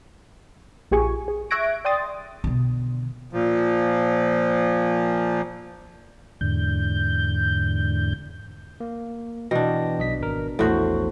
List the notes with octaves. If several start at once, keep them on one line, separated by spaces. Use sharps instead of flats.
A#1 F4 G4 G#4 G#5 C#6
G#4
E5 C#6 F#6 G#6 A#6 D7
D5 G5 C6 D#6 A6
B2 D3
A#2 F3
E2 G#2 D3 G6
A#3
B2 E3 D4 G5 A#6
B1 D#5 B6
G#1 A#4
A#1 E2 A2 F#4 C5